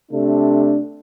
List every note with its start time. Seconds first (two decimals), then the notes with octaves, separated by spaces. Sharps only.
0.12 C3 A3 D4